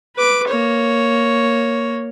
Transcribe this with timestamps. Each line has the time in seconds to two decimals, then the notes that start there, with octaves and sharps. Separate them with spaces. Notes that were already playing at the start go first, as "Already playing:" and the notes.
0.16 B4 D6
0.48 A#3 C#5